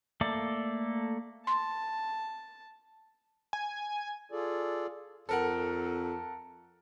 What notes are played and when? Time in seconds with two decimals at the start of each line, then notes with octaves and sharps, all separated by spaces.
0.21 A3 A#3 A4 D5
1.47 A5 C6
3.53 G#5
4.32 F4 G#4 A4 D5
5.29 F2 A4 A#4 F#5